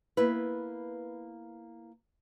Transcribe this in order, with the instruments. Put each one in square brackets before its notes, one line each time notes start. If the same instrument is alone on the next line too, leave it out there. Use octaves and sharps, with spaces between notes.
[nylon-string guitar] A#3 B3 E4 B4